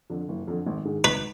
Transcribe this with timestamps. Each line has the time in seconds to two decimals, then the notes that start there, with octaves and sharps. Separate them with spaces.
0.10 F2 D3
0.28 F#1
0.48 F2 D3
0.66 G#1
0.85 G#2 D#3 G#3
1.04 G#1 B4